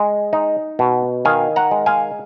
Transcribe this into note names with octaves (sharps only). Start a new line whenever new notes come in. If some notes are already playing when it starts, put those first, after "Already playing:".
Already playing: G#3
D#4
B2
D#3 F5 G#5
F#5 A#5
G#3
F5 G#5